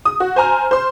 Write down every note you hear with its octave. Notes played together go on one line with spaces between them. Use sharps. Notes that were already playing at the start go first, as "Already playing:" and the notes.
D#6
F#4
C5 G#5 A#5 F6
C5 C6